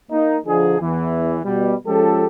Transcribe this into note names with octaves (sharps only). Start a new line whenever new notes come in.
A#3 D#4
D3 F3 D#4 G#4
E2 E3
B2 G3
F3 G#3 C#4 F4 G4 A4